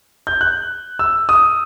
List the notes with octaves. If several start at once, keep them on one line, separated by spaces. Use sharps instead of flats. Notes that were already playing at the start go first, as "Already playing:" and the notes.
G6
F#6
E6
D#6